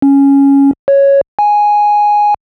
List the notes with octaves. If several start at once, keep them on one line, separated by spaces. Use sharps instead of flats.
C#4
C#5
G#5